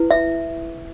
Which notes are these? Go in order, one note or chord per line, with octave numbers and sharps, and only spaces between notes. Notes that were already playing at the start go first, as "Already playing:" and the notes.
Already playing: E4 B4
E5